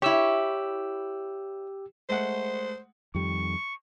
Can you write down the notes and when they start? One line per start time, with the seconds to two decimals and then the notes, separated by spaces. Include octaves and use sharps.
0.02 E4 G4 C#5 E6
2.09 G#3 A3 C5 F#5
3.15 F2 D#3 G3 C#6